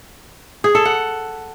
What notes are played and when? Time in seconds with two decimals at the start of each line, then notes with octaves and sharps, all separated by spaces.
0.64 G#4
0.75 A4
0.85 F#5